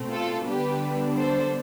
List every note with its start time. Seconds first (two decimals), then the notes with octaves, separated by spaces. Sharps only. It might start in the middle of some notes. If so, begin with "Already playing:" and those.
Already playing: B2 A3 C4
0.12 F4 A4
0.47 D3 G3 B3 D4 G4 B4
1.17 A4 C5